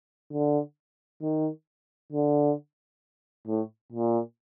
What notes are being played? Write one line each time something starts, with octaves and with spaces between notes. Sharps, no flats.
D3
D#3
D3
A2
A#2